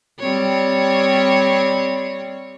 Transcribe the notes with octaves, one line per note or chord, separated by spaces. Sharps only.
G3 C4 C#5